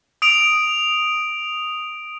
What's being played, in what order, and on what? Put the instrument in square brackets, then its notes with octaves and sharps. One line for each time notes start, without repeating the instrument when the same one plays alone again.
[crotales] D#6 D7 F7